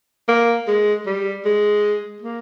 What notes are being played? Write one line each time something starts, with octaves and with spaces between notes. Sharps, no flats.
A#3
G#3
G3
G#3
A#3